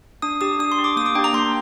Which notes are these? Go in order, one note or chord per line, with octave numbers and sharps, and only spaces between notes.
D4 D#6
G4 D#6
D4 D#6
C6
G4
D6
A#3 D#6
D6
D4 G4 G5
A#5
A#3 C6